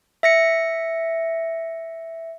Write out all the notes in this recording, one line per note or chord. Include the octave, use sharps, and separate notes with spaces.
E5 A#6 C#7